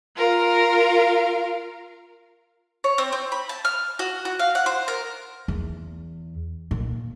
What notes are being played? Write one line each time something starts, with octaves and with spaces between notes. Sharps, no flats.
F4 A#4 F5
C#5
C4
C4
B5
A5
F6
F#4
F#4
F5
F#5
C5
A#4
E2
A#2